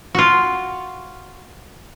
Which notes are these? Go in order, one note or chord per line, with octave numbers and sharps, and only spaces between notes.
F4 F#4